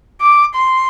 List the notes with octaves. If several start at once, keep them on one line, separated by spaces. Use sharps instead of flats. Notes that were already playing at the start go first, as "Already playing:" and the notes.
D6
C6